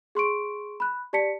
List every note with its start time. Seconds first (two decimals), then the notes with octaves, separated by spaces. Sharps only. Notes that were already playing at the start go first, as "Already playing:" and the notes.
0.15 G#4 C6 C#6 D7
0.80 B5 F#6
1.13 G4 D5 A5 B6 C#7